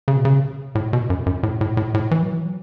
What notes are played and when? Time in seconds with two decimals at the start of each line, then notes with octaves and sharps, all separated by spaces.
0.08 C#3
0.16 B2
0.25 C#3
0.75 A2
0.93 B2
1.10 F#2
1.26 F#2
1.43 A2
1.61 A2
1.77 A2
1.94 A2
2.11 E3
2.22 F#3
2.34 E3
2.46 F#3